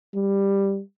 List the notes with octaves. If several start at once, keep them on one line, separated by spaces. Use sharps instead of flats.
G3